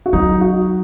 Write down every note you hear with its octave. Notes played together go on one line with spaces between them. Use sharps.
F#4
F#3 D#4
F#4